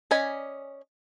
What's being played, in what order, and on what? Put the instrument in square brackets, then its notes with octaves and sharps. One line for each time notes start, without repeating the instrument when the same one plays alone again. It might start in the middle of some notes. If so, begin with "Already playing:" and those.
[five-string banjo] C#4 D5 D#5 G#5 B5